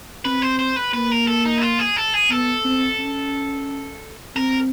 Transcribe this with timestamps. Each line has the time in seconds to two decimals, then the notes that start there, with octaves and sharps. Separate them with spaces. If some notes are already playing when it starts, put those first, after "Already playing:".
0.25 C4 B4
0.42 C5
0.59 C5
0.76 B4
0.93 A#3 B4
1.11 A#4
1.27 A4
1.45 D#4
1.58 E4
1.62 F4
1.79 G#4
1.96 A4
2.14 G#4
2.31 B3 A4
2.65 C4
2.99 C#4
4.36 C4 A#4